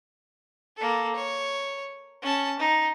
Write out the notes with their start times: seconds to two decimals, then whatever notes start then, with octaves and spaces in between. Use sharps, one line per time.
0.77 A#3 A4
1.15 C#5
2.22 C#4 A5
2.60 D#4